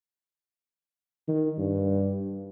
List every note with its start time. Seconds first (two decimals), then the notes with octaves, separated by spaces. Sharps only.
1.28 D#3
1.58 G2